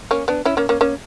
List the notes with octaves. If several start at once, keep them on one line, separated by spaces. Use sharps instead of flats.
A#3 C#4
B3 D4
C#4 E4
A#3 C#4
A#3 C#4
A#3 C#4